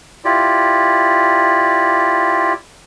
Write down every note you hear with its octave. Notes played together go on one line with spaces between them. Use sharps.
E4 F4 G4 D5